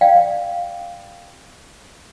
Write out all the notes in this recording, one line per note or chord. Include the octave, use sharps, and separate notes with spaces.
D5 F5 G5